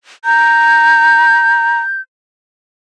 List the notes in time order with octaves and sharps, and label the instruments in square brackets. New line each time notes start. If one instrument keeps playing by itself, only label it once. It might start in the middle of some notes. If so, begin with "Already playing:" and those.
[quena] A#5 [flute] G6